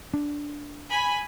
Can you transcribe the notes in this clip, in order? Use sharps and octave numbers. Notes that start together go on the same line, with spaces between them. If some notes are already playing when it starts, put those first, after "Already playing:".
D4
G#5 B5